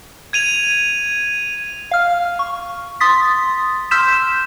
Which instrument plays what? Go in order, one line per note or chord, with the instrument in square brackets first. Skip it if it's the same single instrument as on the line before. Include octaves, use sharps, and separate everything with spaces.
[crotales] G#6 D#7 F7
[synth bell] F5 F6
C#6
C6 D#6 A6 B6
C6 E6 F6 G6 B6 E7